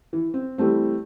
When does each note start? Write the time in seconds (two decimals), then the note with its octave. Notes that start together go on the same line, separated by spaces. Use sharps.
0.13 E3
0.34 C4
0.58 E3 G3 A3 C4